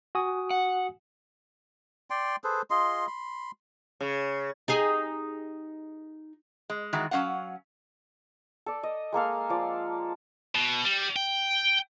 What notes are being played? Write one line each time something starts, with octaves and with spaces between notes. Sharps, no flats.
F#4 G#5 D#6
F#5
D5 G5 C6
G#4 A4 B4 C5
F4 G#4 D#5 C6
B5 C6
C#3
D#4 G4 G#4
G#3
D#3 E3 G#3 F#4
F#3 A#3 C#4 F5 F#5
A4 D5
D#5
G#3 A#3 A4 F5
F3 D5
B2
G3
G5